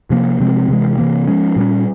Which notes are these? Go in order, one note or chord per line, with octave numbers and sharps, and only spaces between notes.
C3 F3 A#3
C3 F3 G#3 C4
C3 E3 G#3
C3 E3 A#3
F3 G#3 C#4
A#2 G3 C#4